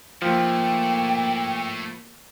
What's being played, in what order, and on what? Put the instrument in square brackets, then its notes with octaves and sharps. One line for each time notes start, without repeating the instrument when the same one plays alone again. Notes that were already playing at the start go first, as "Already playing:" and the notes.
[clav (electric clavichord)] F3 [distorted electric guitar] A3 E4 [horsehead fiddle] A#3 [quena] G5